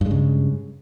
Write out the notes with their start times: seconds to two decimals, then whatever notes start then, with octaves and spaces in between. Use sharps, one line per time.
0.01 G2
0.06 G#3
0.11 C#3